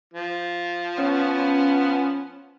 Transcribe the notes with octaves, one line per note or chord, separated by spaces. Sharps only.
F3
B3 C#4